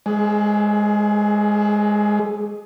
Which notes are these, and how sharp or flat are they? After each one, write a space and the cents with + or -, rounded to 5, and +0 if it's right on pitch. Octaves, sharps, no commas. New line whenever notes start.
G#3 +0 G#4 +30